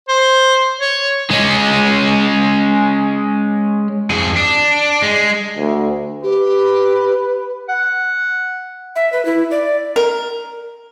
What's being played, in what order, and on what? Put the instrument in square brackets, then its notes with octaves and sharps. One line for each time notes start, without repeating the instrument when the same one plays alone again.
[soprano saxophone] C5
C#5
[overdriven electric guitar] G#3 C#4
F2 G#4
D4
G#3
[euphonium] D2
[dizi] G4 [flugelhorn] B4
[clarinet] F#5
[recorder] E5
B4
E4
D5
[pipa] A#4